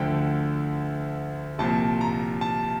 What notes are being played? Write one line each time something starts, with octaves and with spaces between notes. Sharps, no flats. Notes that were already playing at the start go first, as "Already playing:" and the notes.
Already playing: D2 D3 F3 G5
C2 A#2 F3 A5
A#5
A5